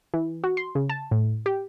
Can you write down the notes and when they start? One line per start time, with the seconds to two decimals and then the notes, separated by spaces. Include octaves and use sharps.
0.14 E3
0.44 F#4
0.57 C6
0.75 C#3
0.89 A5
1.11 A2
1.46 G4